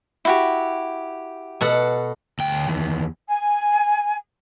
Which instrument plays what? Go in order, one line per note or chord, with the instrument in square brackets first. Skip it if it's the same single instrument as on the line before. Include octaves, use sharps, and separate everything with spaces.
[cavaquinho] E4 F#4 G4
[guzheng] B2 A4 F#5
[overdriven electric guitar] D2 G5
E2 D#3
[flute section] G#5